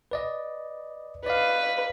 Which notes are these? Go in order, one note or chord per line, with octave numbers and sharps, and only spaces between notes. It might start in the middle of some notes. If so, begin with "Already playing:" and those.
B4 D5 D#5
B4 D5 D#5 F5